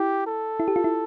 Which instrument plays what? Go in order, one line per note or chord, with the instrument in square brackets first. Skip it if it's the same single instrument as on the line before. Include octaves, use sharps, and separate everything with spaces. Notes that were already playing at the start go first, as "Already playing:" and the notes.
Already playing: [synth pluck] E4 [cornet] G4
[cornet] A4
[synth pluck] E4
G4
F4
E4